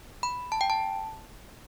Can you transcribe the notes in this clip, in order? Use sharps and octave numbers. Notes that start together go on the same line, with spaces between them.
B5
A5
G5
A5